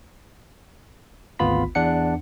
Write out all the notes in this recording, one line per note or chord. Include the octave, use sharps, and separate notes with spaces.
G#1 D2 B3 F4 B5 B6
E2 D4 F#5 C#7